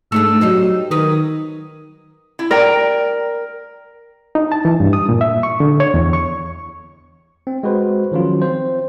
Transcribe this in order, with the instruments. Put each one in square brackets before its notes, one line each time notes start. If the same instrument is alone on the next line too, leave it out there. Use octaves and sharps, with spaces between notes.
[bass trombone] G#2 [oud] A3 D4 A4 [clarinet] E6
[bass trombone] F#3 [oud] G3 D#4 C5
[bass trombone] D#3 [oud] F#3 A#4 B4 [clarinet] D#6
[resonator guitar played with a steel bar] E4
[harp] A#4 [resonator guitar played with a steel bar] D5 G5
[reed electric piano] D#4
A5
E3
G2
D#6
A#2
E5
C#6
D3
C#5
E2
C#6
[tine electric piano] C4
G#3 F#4 B4 C5
D#3 F3 F#3 C#4 F4
C4 C5